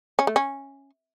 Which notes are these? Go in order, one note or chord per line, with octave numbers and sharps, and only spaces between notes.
C#4
A3
C#4